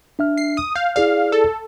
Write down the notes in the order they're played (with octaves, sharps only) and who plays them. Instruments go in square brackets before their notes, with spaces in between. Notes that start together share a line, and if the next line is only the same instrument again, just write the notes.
[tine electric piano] D4 E5 F6
[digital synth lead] C7
D#6
[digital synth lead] F5 [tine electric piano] G6
[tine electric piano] E4 G#4 D5 [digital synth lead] F5
[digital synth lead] A4